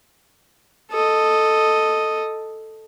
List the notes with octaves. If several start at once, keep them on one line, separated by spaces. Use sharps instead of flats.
A4 D#5